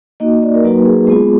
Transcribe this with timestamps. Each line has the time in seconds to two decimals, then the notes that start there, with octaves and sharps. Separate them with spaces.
0.20 A#3 D#4 F#4 D#5
0.43 D5
0.55 A#4
0.64 F#3 A#3 D#4 F#4 B4
0.85 G#4
1.07 G#3 B3 F4 G#4